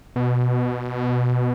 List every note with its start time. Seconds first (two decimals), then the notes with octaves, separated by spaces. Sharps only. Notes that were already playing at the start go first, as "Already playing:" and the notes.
0.16 B2